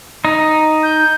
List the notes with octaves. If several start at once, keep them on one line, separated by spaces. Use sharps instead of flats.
D#4
G6